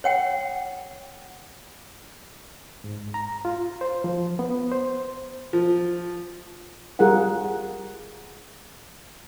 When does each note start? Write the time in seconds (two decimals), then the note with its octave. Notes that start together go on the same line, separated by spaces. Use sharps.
0.04 C#5 F#5 G5
2.84 G#2
3.14 A#5
3.45 F4
3.81 C5
4.04 F3
4.39 B3
4.72 C5
5.53 F3
6.99 G3 F4 G#4 A#4 F#5